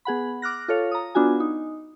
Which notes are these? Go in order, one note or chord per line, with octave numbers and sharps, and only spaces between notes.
B3 G#4 F#5 B5
D6 F6 F#6 A#6
F4 A4 C#5 F5
A#5 D#6
B3 D4 F4 F#4 G#5
D#4